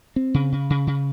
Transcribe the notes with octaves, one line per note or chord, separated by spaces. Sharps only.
C4
C#3
C#3
C#3
C#3